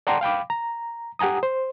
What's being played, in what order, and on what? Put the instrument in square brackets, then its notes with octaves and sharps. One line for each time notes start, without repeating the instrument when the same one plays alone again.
[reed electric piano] D5 F#5 G5 A5 A#5 C6
F5 G5 B5 D6
A#5
G4 F#5 G#5 A#5 D#6
C5